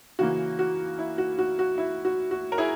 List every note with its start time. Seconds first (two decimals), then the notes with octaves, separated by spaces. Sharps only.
0.19 C#3 E3 A#3 F#4
0.59 F#4
0.99 E4
1.18 F#4
1.39 F#4
1.59 F#4
1.78 E4
2.05 F#4
2.31 F#4
2.52 A#4
2.58 E4 G#4